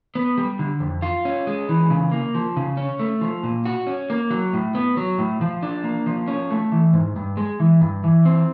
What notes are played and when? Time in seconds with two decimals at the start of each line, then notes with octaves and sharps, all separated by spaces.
0.15 B3
0.38 G3
0.59 D3
0.80 F2
1.02 F4
1.25 C#4
1.47 G#3
1.69 E3
1.90 C#3
2.12 A#3
2.35 F3
2.57 C#3
2.77 C#4
3.00 A3
3.21 F3
3.43 A#2
3.65 F#4
3.87 C#4
4.10 A#3
4.31 F#3
4.53 A2
4.75 B3
4.97 F#3
5.18 A2
5.41 F3
5.63 D4
5.84 A#3
6.06 F3
6.28 C#4
6.51 A3
6.72 E3
6.93 G#2
7.16 G2
7.37 G#3
7.60 E3
7.81 G2
8.04 E3
8.25 C4